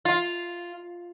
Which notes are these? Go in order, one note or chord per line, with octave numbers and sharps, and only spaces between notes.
F4